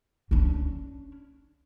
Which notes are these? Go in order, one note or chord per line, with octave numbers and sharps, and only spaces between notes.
C#4 D4